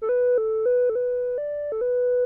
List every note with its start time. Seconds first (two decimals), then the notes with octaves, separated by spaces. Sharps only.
0.02 A4
0.09 B4
0.38 A4
0.66 B4
0.90 A4
0.95 B4
1.38 D5
1.72 A4
1.81 B4